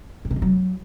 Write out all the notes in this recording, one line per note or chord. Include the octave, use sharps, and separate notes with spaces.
A2
B2
A#2
F#3